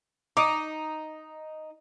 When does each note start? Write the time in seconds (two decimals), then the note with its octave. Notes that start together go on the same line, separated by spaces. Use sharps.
0.37 D#4 D6 D#6